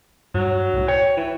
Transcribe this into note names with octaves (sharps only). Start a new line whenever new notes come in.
G2 F#3
C2 A2
C#5 G5
E3